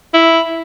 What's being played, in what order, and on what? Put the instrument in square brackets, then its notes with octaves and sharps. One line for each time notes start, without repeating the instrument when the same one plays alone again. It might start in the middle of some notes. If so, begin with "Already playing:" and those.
[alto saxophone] E4